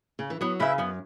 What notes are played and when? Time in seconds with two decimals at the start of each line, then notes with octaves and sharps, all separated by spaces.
0.19 C#3
0.30 E3
0.41 F#3 B3
0.60 C#3 E4 B4 E5
0.78 F#2 B3